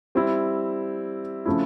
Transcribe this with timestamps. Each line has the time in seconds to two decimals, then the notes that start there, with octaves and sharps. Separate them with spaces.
0.15 G3 C4 E4
1.46 C#3 F3 A3 C4 E4